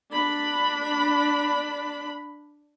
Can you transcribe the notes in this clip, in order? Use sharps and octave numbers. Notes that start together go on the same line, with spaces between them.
D4 B5